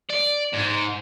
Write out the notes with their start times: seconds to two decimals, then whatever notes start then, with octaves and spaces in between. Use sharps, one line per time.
0.10 D5
0.53 G#2